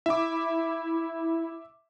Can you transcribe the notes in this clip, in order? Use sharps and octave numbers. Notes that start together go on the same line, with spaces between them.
E4 E5 D6